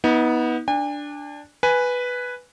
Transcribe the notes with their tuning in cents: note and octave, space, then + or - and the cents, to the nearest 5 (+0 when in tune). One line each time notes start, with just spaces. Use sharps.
B3 -10 D#4 +40
D4 +0 G#5 -45
B4 +0 G#5 +0